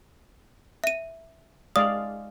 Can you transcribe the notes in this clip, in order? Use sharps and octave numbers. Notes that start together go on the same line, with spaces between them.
E5 D#7
G#3 D5 F5 D#6